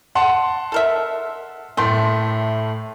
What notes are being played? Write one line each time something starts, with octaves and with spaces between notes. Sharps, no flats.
F#5 A5 C6
A4 A#4 E5
A2 A3 G5 C6